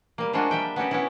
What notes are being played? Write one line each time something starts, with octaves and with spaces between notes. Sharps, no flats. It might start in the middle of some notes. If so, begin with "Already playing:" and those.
G3 A#3
F3 G#3 A#3 D4 F4 F#4
G3 E5 G5
B3 C#4 F#4 G4
B3 C#4 E4